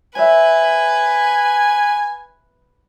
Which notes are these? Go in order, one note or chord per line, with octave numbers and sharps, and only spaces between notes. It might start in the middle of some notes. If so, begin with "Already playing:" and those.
B4 C#5 E5 G#5